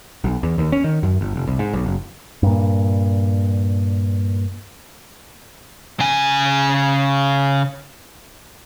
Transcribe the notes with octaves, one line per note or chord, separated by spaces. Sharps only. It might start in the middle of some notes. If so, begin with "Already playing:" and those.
B1
E2
D#2
C#4
D#3
F#2
G1
F1
C2
G#2
B1
F#1
G2 A#2
C#3 G#5